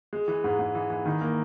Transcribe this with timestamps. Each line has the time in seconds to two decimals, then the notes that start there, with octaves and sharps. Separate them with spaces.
0.13 G#3
0.28 E3
0.44 G#2
0.59 G#2
0.75 E3
0.90 E3
1.06 D#3
1.21 A#3